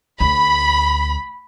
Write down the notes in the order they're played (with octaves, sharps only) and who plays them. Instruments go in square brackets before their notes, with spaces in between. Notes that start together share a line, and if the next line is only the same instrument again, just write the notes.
[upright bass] D2 [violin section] B5